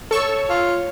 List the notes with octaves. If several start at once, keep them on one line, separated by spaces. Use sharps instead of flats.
A4 C#5 C#6 E6
F4